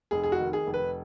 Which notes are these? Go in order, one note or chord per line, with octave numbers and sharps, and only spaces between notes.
F1 G#4
G#4
F#4
D#3
G#4
F1
B4